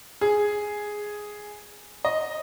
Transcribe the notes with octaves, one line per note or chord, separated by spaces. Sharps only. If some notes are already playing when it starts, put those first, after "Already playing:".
G#4
D#5